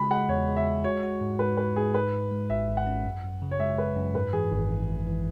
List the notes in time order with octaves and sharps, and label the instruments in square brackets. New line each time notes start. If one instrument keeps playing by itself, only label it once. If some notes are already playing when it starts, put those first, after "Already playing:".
Already playing: [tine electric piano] C#3 G#3 [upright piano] B5
[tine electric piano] G#3 [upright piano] F#5
[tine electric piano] E2 [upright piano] C#5
[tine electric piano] G#3
[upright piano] E5
[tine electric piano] G#3
[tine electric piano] F#4 [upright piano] C#5
[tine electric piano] F#4
G#2
[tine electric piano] G#2 [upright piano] B4
[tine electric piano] G#2 [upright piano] B4
[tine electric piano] G#2 [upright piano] G#4
[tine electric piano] G#2 [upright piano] B4
[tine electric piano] G#2
G#3
[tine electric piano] G#1 [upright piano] E5
[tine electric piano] G#1
[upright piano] F#5
[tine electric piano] C#4
F#2
F#2
C#3
[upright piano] C#5
[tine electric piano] G#3 [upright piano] E5
[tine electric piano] G#3 [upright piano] B4
[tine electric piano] F#2
[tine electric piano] G#2 [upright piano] B4
[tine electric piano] E3 [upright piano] G#4
[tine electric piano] G#1
G#2
G#1
E3